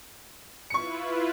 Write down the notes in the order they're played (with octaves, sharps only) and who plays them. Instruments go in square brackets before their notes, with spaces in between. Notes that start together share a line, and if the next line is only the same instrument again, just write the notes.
[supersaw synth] E4 F4 B4 [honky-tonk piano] C#6 C#7